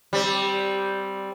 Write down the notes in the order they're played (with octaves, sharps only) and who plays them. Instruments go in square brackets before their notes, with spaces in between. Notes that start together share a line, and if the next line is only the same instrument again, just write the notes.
[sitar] G3 C4